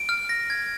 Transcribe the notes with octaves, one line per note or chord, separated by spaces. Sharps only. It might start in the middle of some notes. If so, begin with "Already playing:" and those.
Already playing: D7
F6
A#6
G#6